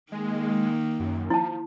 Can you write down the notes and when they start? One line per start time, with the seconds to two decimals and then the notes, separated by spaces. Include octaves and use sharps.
0.12 D#3 G#3 A#3
1.00 F#2
1.30 F3 E4 A5